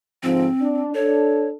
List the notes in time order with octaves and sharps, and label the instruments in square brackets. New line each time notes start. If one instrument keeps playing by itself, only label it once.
[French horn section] G#2 D3 F3 [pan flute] C4
[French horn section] D4
[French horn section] D4 A4 [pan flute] C#5